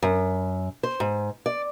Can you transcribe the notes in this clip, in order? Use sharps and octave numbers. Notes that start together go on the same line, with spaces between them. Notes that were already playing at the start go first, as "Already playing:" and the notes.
F#2
C5
G#2
D5